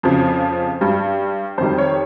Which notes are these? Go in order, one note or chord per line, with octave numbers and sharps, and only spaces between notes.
F2 C#3 F3
G2 G3
F2 D#3 G3 C5
C#5